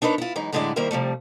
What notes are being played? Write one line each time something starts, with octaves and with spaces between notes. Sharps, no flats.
D4 D#4 A#4 B4 C#5
E4 F4
F#2 E3 G#3 D#4
F#2 A2 D3 G#3 E4 D5
D#3 G3 A#3 E4 A#4 C5
C3 F3 G3 A3